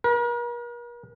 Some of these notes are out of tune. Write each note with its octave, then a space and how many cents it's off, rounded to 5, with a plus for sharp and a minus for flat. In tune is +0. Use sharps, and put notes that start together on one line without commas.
A#4 +45